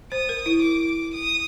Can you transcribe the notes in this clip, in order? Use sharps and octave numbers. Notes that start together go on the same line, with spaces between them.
C5 D#6
A#4
E4
D6
D#6